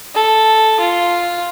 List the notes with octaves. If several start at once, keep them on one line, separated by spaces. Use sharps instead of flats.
A4
F4